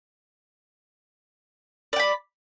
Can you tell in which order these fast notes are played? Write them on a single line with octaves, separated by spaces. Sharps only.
D5 G5 B5